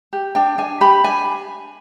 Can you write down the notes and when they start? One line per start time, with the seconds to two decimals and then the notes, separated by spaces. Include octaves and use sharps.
0.13 G4
0.35 D4 G5
0.58 D4 G#5
0.81 G4 B5
1.04 D4 G#5